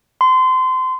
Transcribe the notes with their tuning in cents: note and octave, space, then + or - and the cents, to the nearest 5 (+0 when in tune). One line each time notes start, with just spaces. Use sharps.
C6 -25